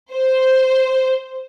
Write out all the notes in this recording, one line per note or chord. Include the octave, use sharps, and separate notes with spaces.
C5